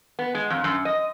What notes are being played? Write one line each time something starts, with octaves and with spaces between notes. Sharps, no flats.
B3
G#3
F2
F#2
D#5